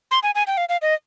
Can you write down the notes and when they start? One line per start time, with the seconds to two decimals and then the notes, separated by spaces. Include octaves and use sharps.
0.11 C6
0.23 G#5
0.35 G#5
0.47 G5
0.57 F5
0.69 F5
0.82 D#5